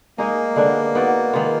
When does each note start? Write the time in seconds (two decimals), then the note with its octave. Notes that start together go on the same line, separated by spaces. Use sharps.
0.18 G#3 A#3 D#4 G#4 D#5
0.56 D3 G#3 B3 D4
0.95 B3 D#4 F#4 D5
1.33 D#3 G#3 B3 F4